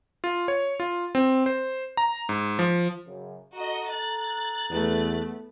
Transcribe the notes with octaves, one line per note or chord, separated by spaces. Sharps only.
F4
C#5
F4
C4
C5
A#5
G#2
F3
F#2 C#3
F#4 A4 D#5 A5 A#5
F#6 A6
E2 A3 B3